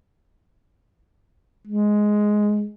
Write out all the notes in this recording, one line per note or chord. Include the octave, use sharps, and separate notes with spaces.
G#3